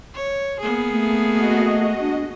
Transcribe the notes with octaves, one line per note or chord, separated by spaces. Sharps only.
C#5
A#3 B3 G#4
A3
F#4 D#5
D4